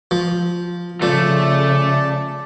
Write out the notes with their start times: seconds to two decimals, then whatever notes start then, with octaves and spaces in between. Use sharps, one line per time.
0.11 F3
1.02 C#3 F3 A3 D5 A5